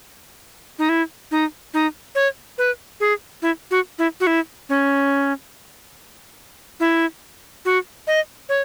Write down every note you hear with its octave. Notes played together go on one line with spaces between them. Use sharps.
D#4
E4
D#4
D#4
C#5
B4
G#4
E4
F#4
E4
F#4
E4
C#4
E4
F#4
D#5
C#5